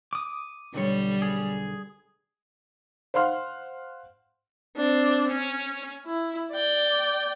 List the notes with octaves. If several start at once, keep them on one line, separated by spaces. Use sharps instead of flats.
D6 D#6
B1 D3 G3 C#5
G#4
C5 F5 F#5 C6 F6
C4 D4
C#4
E4
D5 G5